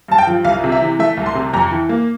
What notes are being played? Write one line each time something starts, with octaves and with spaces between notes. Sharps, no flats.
G2 A5
G5
F3
C2 F5
C3
E5
E3
A3 E5
C2
C6
C3
F2 A#5
E3
A#3